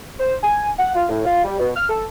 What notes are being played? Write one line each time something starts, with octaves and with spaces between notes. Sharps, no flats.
C5
G#5
F#5
F4
A2
F4
G3
B2
F6
A4